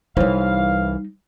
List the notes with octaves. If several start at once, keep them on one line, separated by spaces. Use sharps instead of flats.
C2 E3 G3 D#4 C5 C#5 F5